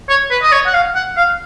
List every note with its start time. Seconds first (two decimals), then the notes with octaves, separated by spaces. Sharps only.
0.09 C#5
0.31 B4
0.43 D#5
0.52 C#5
0.66 F#5
0.74 F5
0.95 F#5
1.17 F5